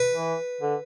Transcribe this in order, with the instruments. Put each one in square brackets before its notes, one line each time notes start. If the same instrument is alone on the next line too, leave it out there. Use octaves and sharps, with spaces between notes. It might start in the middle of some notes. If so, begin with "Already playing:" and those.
Already playing: [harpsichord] B4
[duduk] E3
D3